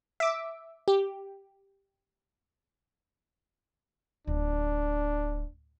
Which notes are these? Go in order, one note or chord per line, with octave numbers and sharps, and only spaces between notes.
E5 D6
G4
D1 D4